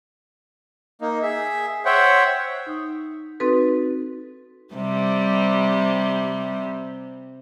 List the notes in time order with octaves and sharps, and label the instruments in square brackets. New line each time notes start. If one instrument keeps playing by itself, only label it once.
[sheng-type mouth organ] A#3 D#4
G#4 E5
C5 C#5 E5 F#5 G5
[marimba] D#4 D#6
C4 D#4 F#4 A4 B4
[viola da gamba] C3 G3